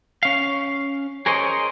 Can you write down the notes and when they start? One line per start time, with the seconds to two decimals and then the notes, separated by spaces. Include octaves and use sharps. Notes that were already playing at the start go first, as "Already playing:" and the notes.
0.23 C#4 F5
1.26 G#4 A#4 C5 C#5 D#5